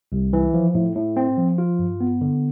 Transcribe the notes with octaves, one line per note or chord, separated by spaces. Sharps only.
C2
E3
F3
A2
A2
C4
F3
F4
G2
B3
D3